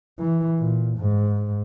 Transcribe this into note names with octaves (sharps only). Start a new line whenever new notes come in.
E3
A#2
G#2